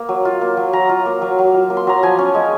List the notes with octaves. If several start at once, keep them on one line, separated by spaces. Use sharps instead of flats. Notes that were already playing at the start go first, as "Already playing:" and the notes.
Already playing: A#3
F#3
F4
A#3
F#3
F#3 A#5
F4
A#3
F#3
F#3
F4
A#3
C6
F#3 A#5
F3 G#5
C#4
G#3